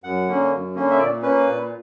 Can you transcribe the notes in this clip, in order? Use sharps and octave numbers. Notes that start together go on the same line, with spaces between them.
F#2 F#5
D3 A#3 C#4
F#2
D3 A#3 C#4
E5
A#2 D5
A#3 C#4 B4
A#2